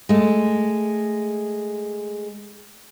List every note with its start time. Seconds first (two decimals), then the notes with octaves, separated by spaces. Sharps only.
0.09 G#3 A3